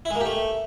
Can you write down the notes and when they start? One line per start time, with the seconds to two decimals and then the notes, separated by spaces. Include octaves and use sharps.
0.05 E4
0.10 G#3
0.16 A#3
0.21 G4
0.26 A3